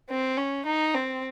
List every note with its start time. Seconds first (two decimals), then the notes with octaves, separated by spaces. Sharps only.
0.10 C4
0.37 C#4
0.66 D#4
0.94 C4